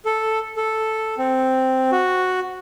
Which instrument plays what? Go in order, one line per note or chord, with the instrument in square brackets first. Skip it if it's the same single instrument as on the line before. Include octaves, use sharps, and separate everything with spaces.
[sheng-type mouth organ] A4
A4
C4
F#4